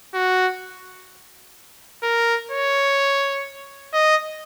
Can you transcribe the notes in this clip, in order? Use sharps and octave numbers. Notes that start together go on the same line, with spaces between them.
F#4
A#4
C#5
D#5